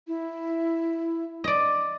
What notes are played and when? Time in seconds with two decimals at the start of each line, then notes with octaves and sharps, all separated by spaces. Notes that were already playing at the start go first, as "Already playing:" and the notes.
0.07 E4
1.44 D5 D#5